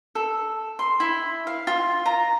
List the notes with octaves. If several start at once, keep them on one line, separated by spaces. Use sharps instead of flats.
A4
C6
E4
F5
F4
A#5